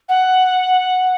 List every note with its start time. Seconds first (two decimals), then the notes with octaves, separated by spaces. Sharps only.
0.09 F#5